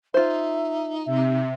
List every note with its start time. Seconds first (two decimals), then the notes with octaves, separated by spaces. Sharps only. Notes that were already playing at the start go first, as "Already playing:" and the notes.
0.14 D#4 F4 C5 E5
1.06 C3 E5